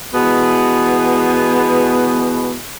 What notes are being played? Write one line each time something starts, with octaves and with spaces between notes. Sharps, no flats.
B2 E3 G#3 B3